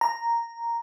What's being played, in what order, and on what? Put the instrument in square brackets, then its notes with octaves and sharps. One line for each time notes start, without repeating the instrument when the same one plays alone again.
[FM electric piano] A#5